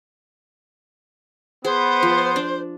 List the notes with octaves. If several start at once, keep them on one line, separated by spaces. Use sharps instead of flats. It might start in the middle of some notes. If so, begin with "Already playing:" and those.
B3 G#4 C5
F3
D4